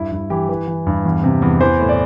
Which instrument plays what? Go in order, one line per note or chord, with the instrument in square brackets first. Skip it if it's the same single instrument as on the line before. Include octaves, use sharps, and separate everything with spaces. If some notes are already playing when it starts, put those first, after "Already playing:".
Already playing: [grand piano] G2 E4
G2 E4
E3 G4
E3 B4
E3
G2
E2
C3
E2
E3 C5
A2
D5